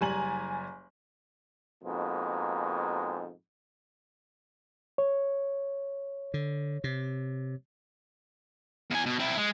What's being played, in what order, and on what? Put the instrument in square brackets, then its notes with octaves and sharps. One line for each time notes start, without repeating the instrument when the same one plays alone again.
[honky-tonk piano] F#1 G3 G#5 A#5 F#7
[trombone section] F2 G#2 B2 G#3 A#3
[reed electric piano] C#5
[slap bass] D3
C3
[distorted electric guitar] E2 G#5
B2
C4 E4
G#3